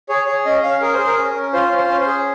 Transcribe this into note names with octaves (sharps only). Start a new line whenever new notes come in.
G#4 C#5
G#4 C#5
C#4 D#5
C#4 F5
G#4 A#4
G#4 C5
A#4
C#4
C#4
F4 C5
C#4
C5
C#4
C5
G#4